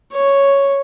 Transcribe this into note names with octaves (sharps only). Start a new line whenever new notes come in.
C#5